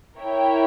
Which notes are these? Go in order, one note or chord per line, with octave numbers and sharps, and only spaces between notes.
E4 A#4 C#5 E5 G5